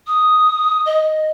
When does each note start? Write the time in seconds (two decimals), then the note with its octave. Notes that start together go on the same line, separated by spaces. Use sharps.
0.06 D#6
0.85 D#5